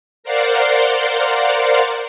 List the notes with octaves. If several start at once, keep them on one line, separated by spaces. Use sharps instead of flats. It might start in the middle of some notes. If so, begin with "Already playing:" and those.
A#4 C5 D5 F5 F#5 C6